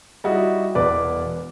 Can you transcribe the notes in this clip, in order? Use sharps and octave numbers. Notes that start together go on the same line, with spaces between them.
G3 D#4 E4 F#4
E1 E2 B4 D5 D6